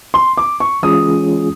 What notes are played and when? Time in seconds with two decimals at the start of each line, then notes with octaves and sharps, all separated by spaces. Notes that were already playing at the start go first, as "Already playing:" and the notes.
0.14 C6
0.37 D6
0.60 C#6
0.83 E3 G#3 C#4 F4 G#4 D#6